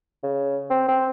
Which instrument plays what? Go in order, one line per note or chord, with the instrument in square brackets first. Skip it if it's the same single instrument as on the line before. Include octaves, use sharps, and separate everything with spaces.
[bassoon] C#3
C4
C4